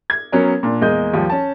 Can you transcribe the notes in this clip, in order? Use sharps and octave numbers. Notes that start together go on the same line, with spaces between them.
G#6
F#3 B3 C#4 A#4 C#5
A#2 D4
E2 G#3 A#3 D#5 G6
D#2 F3 G3
C#4 A5